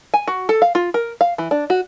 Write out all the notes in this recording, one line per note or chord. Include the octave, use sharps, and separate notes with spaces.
G#5
F#4
A4
F5
F4
A#4
F5
E3
D4
F#4